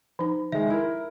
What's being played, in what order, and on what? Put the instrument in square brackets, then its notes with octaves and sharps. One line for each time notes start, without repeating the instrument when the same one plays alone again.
[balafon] F3 D#4
[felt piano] D#3 G#3 [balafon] E5
[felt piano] E4 A#4